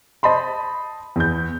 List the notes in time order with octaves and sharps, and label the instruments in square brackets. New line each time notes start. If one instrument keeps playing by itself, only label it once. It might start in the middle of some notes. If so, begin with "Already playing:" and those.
[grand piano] C5 D#5 A5 B5 C6
E2 G6